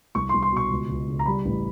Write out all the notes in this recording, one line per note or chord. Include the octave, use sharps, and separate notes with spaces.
C2 C#6
C6
C2
C6
B2 C#6
C#2
C#2
C#3
A#5
G3 B5
A1